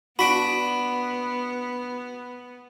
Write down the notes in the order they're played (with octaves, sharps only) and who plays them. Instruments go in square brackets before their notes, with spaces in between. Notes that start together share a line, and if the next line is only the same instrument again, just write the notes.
[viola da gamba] B3 [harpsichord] D4 F#4 [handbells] B5 B6 D7